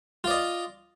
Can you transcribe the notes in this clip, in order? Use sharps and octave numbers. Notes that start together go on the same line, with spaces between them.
F4 D5 D#5